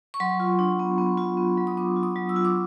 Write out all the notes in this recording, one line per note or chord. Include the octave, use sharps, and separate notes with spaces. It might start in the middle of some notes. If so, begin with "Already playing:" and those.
C#6
F#3 C6
F4
D4
B3
B3
F4
B3
F#3
D#6
B3 D6
F4
D#6
F#3
E6
F4
D6